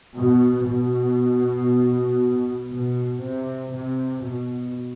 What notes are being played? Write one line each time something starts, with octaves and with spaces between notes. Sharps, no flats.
B2
B2
B2
C3
C3
B2